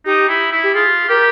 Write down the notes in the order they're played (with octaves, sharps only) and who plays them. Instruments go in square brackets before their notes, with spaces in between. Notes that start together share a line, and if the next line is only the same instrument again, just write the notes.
[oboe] D#4 [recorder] G4
[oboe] E4
E4
[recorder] G4
[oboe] F4 [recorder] G#4
[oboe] G4 [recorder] A#4